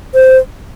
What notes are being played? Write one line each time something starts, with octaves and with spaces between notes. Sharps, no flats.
C5